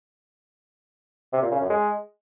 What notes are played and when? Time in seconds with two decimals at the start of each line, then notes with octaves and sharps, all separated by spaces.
1.33 C3
1.42 A#2
1.52 C#3
1.61 F#2
1.70 G#3